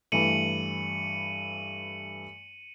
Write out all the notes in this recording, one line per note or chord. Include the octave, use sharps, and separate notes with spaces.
G2 E3 A3 C#7 D#7 F#7